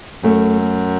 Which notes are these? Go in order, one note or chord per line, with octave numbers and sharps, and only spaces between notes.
F#2 A3